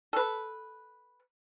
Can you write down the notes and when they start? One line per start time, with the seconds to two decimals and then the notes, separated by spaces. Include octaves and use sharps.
0.13 A4 B4